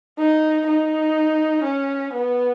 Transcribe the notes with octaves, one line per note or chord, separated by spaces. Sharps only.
D#4
D#4
C#4
B3